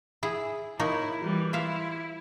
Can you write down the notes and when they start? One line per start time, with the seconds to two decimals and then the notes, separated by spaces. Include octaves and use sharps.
0.23 E4 G#4
0.79 A#3 D#4 E4 C#5
1.21 E3 G3
1.53 E4 F4 E5 F5